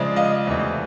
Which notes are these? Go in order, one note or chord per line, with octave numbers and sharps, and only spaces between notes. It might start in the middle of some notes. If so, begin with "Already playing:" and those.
Already playing: C#3 F3 G#3 D5 E5
D#5 F5
E2 C3 E3 A3